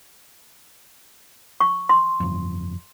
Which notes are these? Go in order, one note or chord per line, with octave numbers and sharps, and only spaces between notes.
C#6
C6
G1 F2